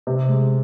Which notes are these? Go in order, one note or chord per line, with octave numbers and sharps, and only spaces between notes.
C3
G#3